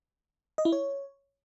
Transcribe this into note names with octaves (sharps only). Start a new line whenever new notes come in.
D#5
E4
C#5